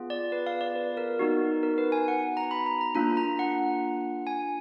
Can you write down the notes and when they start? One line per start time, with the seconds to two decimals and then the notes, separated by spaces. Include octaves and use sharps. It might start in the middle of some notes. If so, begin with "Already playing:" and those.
Already playing: B3 F4 G#4
0.10 D5
0.32 B4
0.47 F5
0.61 D5
0.76 B4
0.97 A#4
1.19 B3 D#4 F#4
1.63 A#4
1.78 B4
1.92 G#5
2.08 F#5
2.37 A#5
2.51 B5
2.66 A#5
2.81 A#5
2.95 A#3 D4 F4 A#5
3.17 A#5
3.39 F#5
4.27 G#5